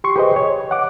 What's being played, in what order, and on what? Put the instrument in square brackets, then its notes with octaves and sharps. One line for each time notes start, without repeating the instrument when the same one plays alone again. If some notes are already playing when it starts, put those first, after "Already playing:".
[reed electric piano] G4 C6 C#6
G4 G#4 B4 C5 D#5
C#5
F#5 D6